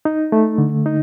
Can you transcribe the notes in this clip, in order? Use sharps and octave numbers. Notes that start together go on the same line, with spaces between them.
D#4
A3
D3
D#4